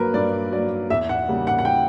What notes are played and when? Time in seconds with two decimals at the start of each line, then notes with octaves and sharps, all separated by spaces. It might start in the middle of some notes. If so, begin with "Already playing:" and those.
Already playing: G2 F#3 A#3 A#4 B4
0.14 G2 D5
0.52 F#3 A#3 D5
0.90 E2 E5
1.09 F#5
1.28 C#3 G3 A#3
1.47 F#5
1.59 F#5
1.65 G5